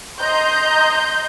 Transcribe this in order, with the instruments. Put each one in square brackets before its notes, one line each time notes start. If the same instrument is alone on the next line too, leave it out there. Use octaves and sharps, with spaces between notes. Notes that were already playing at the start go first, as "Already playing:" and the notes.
[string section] D#5 A#5 C6 G6